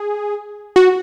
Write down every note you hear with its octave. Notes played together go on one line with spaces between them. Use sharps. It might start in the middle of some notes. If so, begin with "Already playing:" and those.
Already playing: G#4
F#4